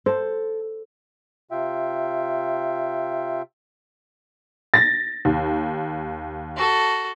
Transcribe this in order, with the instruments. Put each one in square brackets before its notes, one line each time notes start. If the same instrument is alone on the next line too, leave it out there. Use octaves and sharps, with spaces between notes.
[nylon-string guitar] A4 [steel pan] C5
[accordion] C3 F4 E5 G5
[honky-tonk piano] A6 A#6
D#2
[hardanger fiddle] F#4 A4